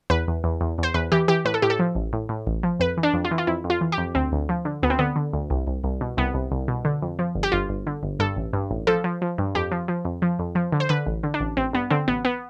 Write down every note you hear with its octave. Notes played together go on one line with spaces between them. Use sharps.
E2 B4
E2
E2
E2
E2 C5
E2 B4
E3 G4
E3 G4
A2 B4
A4
A2 G4
A4
F3
A1
A2
A2
A1
F3
F2 B4
E3
D4
F2
F4
E3
F4
F2 E4
F2
F4
E3
G4
F2
D2 C4
D2
F3
D3
D2 B3
C4
D3 B3
D3
D2
C2
C2
C2
B2
C2 B3
C2
C2
B2
D3
F2
F3
G1
G4
G1 F4
G1
D3
G1
G2 A4
A1
G2
A1
F3 A4
F3
F3
G2
F2 G4
F3
F3
F2
F3
F2
F3
D3
C5
D3 B4
A1
D3
D4
A1
A1 C4
G2 B3
D3 C4
A1 B3
B3